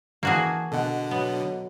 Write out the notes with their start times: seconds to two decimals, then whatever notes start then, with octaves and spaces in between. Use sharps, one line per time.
0.23 E3 A#3 F#4 G#4 A5
0.72 B2 D3 A4 D#5 F#5
1.11 F#3 B3